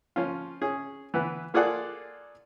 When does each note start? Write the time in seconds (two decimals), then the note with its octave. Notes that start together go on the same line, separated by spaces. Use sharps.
0.16 F3 C#4 F4
0.61 C#4 G#4
1.14 E3 B3 B4
1.54 A#3 F4 G#4 A4 D5 F#5